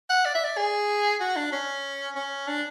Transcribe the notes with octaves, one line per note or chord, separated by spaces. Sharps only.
F#5
D5
E5
D5
G#4
F#4
D4
C#4
C#4
D4